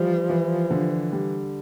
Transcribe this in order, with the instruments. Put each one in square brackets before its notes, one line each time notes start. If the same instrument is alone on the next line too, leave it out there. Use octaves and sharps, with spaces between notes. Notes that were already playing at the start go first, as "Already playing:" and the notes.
Already playing: [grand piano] E3 G3 [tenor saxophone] F3
[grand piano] E3
D3
G3